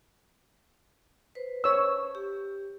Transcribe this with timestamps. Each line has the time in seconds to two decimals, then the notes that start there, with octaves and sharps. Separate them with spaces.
1.35 B4 C5
1.64 C#5 E6
2.15 G4